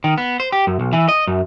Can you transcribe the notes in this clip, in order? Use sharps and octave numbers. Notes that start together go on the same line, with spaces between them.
D#3
B3
C5
G4
F#2
B1
E3
D#5
F#2